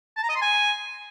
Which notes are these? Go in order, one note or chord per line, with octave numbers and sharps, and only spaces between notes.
A5
A#5
D#5
C6
G#5